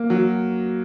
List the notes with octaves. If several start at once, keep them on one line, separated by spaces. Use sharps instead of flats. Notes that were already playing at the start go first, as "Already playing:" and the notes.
Already playing: A#3
F#3